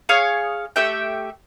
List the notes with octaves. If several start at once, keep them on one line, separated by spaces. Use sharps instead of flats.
G#4 C#5 F5 D#6
A3 G4 E5 G5